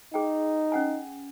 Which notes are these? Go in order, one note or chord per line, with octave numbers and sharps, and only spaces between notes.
D#4 G#4 G5
C#4 F#5 G#5